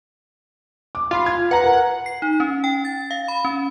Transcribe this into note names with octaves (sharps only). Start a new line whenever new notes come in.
D6
F4 B5 C6
G#6
B4 F#5 A#5
A#4
C7
D#4
C#4
G5
A6
F5
B5
C#4